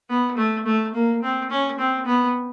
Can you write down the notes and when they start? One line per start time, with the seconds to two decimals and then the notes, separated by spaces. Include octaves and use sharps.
0.09 B3
0.37 A3
0.66 A3
0.94 A#3
1.23 C4
1.50 C#4
1.79 C4
2.06 B3